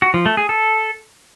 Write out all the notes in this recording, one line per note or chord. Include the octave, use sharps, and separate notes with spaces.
F#4
F3
A3
G#4
A4